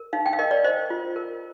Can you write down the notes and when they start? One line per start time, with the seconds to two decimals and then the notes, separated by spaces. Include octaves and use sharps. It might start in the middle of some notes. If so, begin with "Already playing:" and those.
Already playing: A#4
0.13 D#4 F5
0.26 G5
0.33 F5
0.39 A#4 D#5
0.51 D5
0.64 C5 D#5
0.90 F4
1.16 A#4